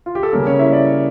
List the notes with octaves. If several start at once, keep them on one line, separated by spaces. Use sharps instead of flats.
F4
G4
A4
C#3 G3 A#3 C#4 A#4
C#4 C#5
E4 E5
D5
C#5